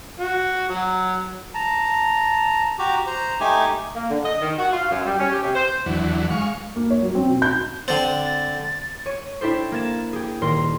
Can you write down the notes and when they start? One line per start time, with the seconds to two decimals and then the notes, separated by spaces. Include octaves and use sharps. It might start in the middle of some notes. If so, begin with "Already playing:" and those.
0.20 F#4
0.69 F#3
1.54 A5 A#5
2.79 F#4 G4 A#5
3.07 C5 A#5
3.40 A3 D#4 G4 G#5
3.94 A#3
4.10 D3
4.25 D#5
4.42 D#3
4.58 F#4
4.72 F4
4.91 F#2
5.06 G3
5.19 C#4
5.32 G4
5.43 C3
5.55 C5
5.86 E2 D3 E3 F#3
6.31 G#3 F5 C#6
6.76 A#3
6.90 C#5
7.02 F#3
7.15 C4
7.28 B2
7.42 G6
7.88 D3 C4 A6
9.06 C#5 C#6 D#7
9.41 D4 E4 G4 A4 C5
9.72 A#3 G#6 A6 E7
10.13 G4 G#4
10.41 D#1 A#4 C6